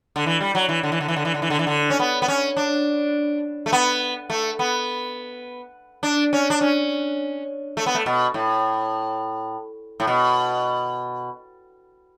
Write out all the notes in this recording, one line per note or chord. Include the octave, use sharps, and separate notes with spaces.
D3
E3
G3
F#3
E3
D3
E3
D3
E3
D3
E3
D3
E3
D3
E3
D3
C#4
B3
B3
C#4
D4
A3
B3
A3
B3
D4
C#4
D4
C#4
A3
B3
A3
B2
A2
A2
B2